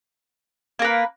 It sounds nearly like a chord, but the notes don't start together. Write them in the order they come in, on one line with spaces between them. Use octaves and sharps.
A#3 A#4 B4